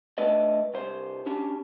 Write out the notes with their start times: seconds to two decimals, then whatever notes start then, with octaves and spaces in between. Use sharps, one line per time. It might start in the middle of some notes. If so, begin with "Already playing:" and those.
0.18 A3 D4 B4 D5 D#5
0.74 C2 G2 C5
1.26 C#4 D4 G4